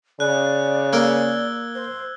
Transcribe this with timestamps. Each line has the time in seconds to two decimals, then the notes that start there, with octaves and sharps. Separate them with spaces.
0.20 C#3 D5 F#6
0.93 A#3 A#4 D5 E6 G#6 G7
1.75 C5